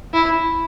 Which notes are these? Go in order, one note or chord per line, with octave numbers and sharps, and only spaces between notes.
E4